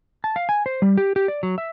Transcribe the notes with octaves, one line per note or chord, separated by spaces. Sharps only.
A5
F5
G#5
C5
G3
G4
G4
D5
F#3
E5